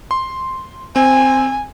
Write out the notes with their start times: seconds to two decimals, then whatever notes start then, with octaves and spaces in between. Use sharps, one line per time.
0.11 C6
0.96 C4 G#5